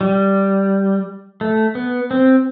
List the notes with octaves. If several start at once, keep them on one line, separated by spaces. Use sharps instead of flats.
G3
A3
B3
C4